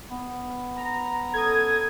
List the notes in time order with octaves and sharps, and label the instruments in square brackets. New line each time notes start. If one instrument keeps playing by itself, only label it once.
[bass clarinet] B3
[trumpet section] A#5
[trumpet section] C#4 A#5 D#6 [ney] A4 [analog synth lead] G#6